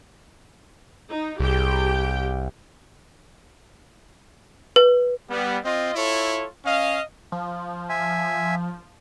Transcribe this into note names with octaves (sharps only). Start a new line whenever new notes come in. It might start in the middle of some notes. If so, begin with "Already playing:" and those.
D#4
C2 G4 G#4 G5
B4
G3 B3
C4 F4 D#5
E4 F4 A4 C#5
C#4 D#5 F5
F3
E5 G#5